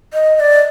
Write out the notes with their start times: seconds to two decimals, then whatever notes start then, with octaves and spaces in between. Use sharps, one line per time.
0.13 D#5
0.36 D#5
0.40 D5